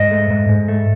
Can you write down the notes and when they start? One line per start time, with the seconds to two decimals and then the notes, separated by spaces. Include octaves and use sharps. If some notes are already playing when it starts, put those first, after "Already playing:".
Already playing: G#2 D#5
0.11 A3
0.30 G#2
0.49 G#2
0.68 A3